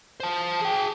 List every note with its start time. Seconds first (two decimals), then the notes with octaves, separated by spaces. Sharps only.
0.20 C5 A5
0.62 G#4 G5